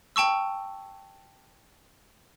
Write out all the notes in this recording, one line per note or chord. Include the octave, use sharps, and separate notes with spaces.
G5 A5 C#6 E6